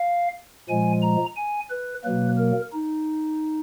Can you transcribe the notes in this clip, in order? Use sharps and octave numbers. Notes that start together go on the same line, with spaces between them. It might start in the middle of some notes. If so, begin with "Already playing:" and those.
Already playing: F5
A#2 F3 G#3 G#5
A#5
G#5
B4
B2 F#3 A#3 B4
A#4
D#4